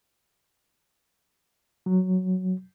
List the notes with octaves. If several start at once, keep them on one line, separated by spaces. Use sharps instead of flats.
F#3